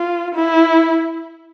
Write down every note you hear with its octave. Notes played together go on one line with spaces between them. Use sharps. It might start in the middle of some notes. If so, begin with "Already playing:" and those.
Already playing: F4
E4